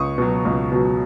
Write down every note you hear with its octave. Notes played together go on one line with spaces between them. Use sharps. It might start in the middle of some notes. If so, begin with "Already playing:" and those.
Already playing: C#2 C#6 D#6
B2 F#3
C#2
B2 F#3